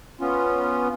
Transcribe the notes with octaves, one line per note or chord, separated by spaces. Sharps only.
B3 C#4 F4